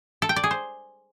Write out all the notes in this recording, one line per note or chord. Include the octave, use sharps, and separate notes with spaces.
A4
G5
D5
G#4
C5